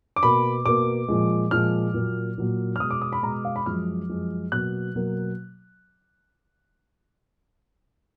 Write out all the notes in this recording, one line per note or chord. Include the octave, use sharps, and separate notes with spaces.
D6
B2 A#3 B5
B2 A#3 D6
A#2 F3 G#3
A#2 F3 G#3 F6
A#2 F#3 A#3
A#2 F#3 A#3
F6
B2 G#3 D#6
D6
D#6
B5
B2 G#3 A#5
F5
B5
F#2 F3 G#3 F6
F#2 F3 G#3
B2 F#3 A#3 F#6
B2 F#3 A#3